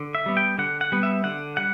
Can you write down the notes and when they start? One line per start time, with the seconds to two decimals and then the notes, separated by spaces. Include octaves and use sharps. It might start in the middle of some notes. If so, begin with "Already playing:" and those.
Already playing: D3
0.15 E5
0.26 G3 B3
0.37 G5
0.58 D3 F#5
0.81 F#5
0.92 G3 B3
1.03 E5
1.24 D3 F#5
1.57 G3 F#5